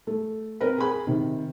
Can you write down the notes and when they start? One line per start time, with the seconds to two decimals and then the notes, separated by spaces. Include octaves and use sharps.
0.07 A3
0.61 C4 A#4 B4
0.78 G#4 B5
1.07 C3 D#3